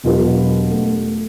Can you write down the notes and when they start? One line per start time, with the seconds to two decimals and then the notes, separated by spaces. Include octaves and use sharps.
0.04 E1 B2 F#3 F4 G4 B4
0.70 A3